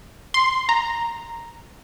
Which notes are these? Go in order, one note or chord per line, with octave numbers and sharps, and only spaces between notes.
C6
A#5